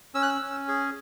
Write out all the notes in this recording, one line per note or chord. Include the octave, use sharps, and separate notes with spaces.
C#4 E6
F#6
E6
C#4
G#4